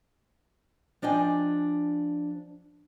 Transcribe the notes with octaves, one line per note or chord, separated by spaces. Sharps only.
F3 D4 D#5 G5 G#5